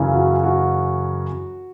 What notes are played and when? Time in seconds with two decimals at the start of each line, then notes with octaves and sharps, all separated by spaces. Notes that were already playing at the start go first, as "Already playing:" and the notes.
Already playing: F#2 C#3 E3
0.15 F#4
0.44 F#4